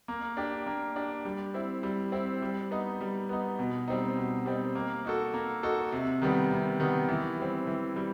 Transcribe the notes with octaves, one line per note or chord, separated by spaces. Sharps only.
A#3
D4 G4
A#3
D4 G4
G3
C4 E4
G3
C4 E4
G3
B3 D#4
G3
B3 D#4
B2
G3 C4 D#4
B2
G3 C4 D#4
A#3
D#4 F#4 A4
A#3
D#4 F#4 A4
C3
D#3 G3 B3
C3
D#3 G3 B3
E3
G3 C4
E3
G3